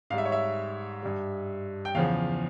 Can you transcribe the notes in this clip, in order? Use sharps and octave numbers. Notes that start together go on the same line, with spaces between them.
G#2 G3 E5 F5
C#5
E5
G2 G3
G5
E2 C#3 F3 F5